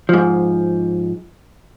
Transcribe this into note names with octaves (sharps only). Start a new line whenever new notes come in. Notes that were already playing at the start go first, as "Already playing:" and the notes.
G#2 F3